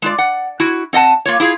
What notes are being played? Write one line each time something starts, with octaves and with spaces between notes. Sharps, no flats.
G#3 F4 D5
F#5
E4 F#4
C4 D#5 F#5 A5
A#3 F4 C#5
E4 F4 G#4